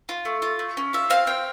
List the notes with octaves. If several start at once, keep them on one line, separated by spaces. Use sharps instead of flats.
F4
A3
F4
A3
C#4
F4 E5
C4 F5
C4 G5